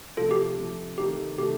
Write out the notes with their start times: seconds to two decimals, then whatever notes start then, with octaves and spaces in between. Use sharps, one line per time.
0.17 C3 F3 A3 F4 A4
0.31 G4
0.57 C3 F3 A3
0.98 C3 D#3 A3 G4
1.38 C3 D#3 A3 G4